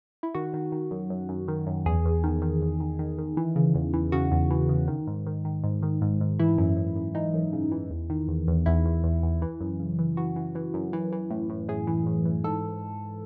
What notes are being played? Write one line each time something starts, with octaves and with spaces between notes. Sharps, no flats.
E4
D#3 F#4
D#3
D#3
F#2
F#2
F#2
D#3
F#2
E2 G#4
E2
D#3
D#3
E2
D#3
D#3
D#3
E3
C#3
E2
E3
C#3 F#4
E2
E3
C#3
D#3
G#2
D#3
D#3
G#2
D#3
G#2
G#2
E3 E4
F#2
F#2
F#2
E3 D#4
F#2
C#3
E3
E2
D#3
E2
E2
E2 E4
E2
E2
E2
E3
F#2
C#3
E3
E3 F#4
E3
E3
F#2
E3
E3
A2
A2
A2 G#4
E3
A2
E3
G#2 A4